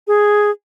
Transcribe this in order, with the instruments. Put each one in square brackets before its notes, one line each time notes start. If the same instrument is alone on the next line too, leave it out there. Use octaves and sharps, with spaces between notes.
[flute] G#4